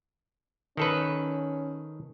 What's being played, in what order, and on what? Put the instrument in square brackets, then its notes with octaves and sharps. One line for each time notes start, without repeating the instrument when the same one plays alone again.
[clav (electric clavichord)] D#3 A4 B4 [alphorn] C#4